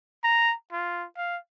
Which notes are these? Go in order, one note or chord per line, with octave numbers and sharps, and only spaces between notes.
A#5
F4
F5